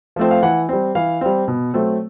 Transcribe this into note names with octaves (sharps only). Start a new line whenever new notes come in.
F3 A3 C4
F5
E3 F#5
G3 C4
E3 F5
G3 C4
B2
F#3 A3 C4